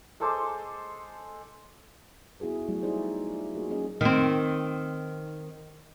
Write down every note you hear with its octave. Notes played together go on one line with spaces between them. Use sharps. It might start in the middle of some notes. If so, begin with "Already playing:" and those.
G#3 A4 C5 D6
B3 E4 F#4 G#4 B4
F#3 G3 A3 E4 F#4
D#4 E4 G4 G#4 C5 D5
F4
A#3 F#4 G#4
F#3 A#3 C#4 G#4 D#5
D#3 C4